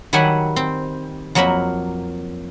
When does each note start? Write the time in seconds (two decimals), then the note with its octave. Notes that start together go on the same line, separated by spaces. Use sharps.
0.13 D#3 F#3 G3 E5 F#5 G#5
0.56 C4
1.35 F2 F#3 A#3 A#4 B5